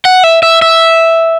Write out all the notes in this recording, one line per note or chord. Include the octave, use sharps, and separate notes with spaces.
F#5
E5
E5
E5